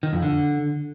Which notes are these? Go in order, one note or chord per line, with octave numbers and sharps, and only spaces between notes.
D#3
F2
D3